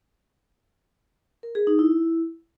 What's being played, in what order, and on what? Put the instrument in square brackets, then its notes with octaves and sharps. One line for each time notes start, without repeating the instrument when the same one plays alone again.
[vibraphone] A#4
G#4
D#4
E4